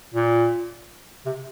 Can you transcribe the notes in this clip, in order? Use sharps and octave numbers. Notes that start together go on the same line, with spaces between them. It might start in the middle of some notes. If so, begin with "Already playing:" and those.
A#2
C3